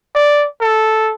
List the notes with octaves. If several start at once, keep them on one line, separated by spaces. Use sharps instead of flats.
D5
A4